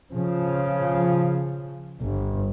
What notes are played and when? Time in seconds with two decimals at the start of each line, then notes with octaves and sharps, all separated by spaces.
0.13 C#3 F3
2.01 G1